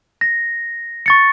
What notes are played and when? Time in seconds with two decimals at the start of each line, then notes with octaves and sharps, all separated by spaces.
0.21 A#6
1.06 C#6 A6 C#7